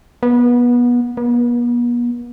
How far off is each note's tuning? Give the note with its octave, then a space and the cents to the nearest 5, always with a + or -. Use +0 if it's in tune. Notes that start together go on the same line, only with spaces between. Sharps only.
B3 -25
B3 -45